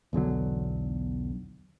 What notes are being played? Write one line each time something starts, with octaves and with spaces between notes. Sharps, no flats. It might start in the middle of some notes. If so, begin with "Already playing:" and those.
B1 E2 D3 F#3